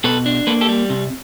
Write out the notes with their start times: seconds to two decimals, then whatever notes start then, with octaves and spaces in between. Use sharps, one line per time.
0.04 B2 A4 B4
0.26 D4
0.47 A#3 A4 B4
0.61 G4 A4
0.68 G3
0.90 C3